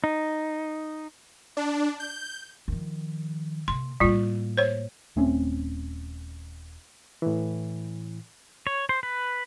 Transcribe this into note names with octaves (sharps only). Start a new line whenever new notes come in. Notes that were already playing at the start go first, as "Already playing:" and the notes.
D#4
D4
G6
D#3 F3
C3 A#3 C6
A2 G3 A#3 F4
C5 C#5
D#1 A3 C4 C#4
A2 E3
C#5
C5
B4